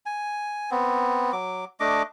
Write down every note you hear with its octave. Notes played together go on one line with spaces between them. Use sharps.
G#5
B3 C4
F#3 D6
A3 D4 D#5 D6